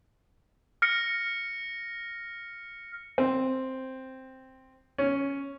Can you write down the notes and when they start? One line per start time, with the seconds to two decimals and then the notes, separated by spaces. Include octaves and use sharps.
0.82 F6 A#6 C#7
3.18 C4
4.98 C#4